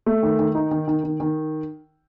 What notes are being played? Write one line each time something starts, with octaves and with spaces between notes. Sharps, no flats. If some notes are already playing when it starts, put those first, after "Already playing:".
A3
D#3
D#3
D#4
D#3
D#3
D#3
D#3